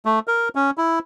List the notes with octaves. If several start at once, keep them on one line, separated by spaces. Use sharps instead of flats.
A3
A#4
C#4
E4